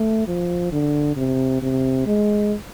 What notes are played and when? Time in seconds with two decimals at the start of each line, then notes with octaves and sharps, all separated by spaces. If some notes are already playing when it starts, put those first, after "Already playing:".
Already playing: A3
0.28 F3
0.72 D3
1.16 C3
1.62 C3
2.07 G#3